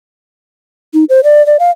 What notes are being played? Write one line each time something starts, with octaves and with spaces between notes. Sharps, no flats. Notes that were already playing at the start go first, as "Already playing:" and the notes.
D#4
C5
D5
D5
F5